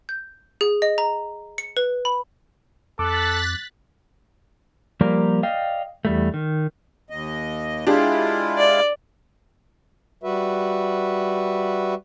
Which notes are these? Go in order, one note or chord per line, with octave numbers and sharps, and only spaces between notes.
G6
G#4
D#5
A#5
C#7
B4
B5
F2 A4 D6 F#6 A6 B6
F3 G3 A#3 G4 A#4 D5
D5 D#5 F5 G5
E2 G3 A3
D#3
D#2 D#5
G#3 D4 E4 F4 G4 G#4
D5
G3 F#4 B4 E5